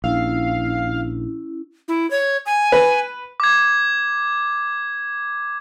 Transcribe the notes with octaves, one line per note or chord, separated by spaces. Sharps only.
A#1 C#4 E4 F5
E4
C#5
G#5
B4
D6 G#6